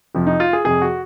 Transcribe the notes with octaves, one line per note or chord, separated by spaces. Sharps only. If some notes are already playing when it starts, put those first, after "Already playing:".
F2 C3 F3
D#4
F4
G#4
F2 C3 F3 G#4
F#4